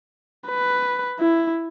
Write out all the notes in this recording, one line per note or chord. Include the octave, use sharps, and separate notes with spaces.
B4
E4